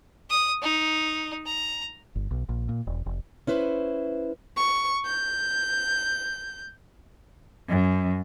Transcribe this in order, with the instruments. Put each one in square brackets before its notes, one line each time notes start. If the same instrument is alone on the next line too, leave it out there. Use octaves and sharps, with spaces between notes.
[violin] D#6
D#4
A#5
[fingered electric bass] G1
B1
A#1
A#2
E1
F1
[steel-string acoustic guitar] C#4 E4 B4 C5
[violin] C#6
G6
[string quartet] F#2